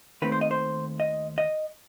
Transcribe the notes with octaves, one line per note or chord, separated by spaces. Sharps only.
D#2 D#3 A3 C4 B4
C5
D#5
C5
D#5
D#5